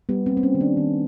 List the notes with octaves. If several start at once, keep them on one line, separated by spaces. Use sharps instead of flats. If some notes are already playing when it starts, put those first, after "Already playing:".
G3 B3
C4
A#3
C4
C#4
D#3
D4
D#3